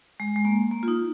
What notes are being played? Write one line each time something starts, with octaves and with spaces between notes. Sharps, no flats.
G#3
G#3
A#3
A#3
F4
D#4